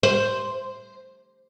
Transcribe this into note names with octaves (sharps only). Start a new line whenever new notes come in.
C5